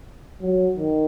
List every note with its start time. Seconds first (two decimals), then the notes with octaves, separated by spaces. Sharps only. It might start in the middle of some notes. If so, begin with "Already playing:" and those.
0.41 F#3
0.77 D#3